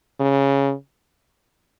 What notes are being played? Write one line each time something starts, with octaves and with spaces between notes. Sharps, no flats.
C#3